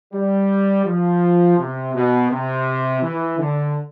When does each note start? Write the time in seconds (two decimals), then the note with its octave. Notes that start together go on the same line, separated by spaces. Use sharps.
0.14 G3
0.86 F3
1.59 C3
1.95 B2
2.31 C3
3.03 E3
3.39 D3